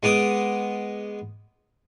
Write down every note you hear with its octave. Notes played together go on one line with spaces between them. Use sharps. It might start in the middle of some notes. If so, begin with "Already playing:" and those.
G#3 B3 D6 D#6